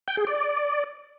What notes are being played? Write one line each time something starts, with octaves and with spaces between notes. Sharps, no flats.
G5
G#4
D5